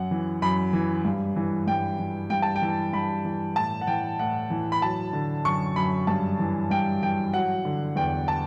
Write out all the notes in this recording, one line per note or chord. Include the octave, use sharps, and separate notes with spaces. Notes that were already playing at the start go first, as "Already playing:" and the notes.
Already playing: F#2 F#5
E3
F#2 B5
E3
G2
E3
G2 G5
E3
G2 G5
A5
G5
E3
G2 B5
E3
A2 A5
F#5
E3 G5
A2 F#5
E3
B5
F#3 A5
D3
F#2 C#6
F#2 B5
G2 A5
E3
G2 G5
E3 G5
F#3 F#5
D3
E2 G5
A5